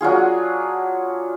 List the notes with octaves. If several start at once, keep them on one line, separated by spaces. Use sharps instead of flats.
F#3 D4 F4 G#4